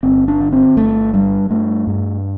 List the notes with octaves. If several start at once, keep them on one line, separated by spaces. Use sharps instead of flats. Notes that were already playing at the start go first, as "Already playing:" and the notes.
G1 C4
D4
D3
C4
G1 A3
G2 G3
G2 A3
G2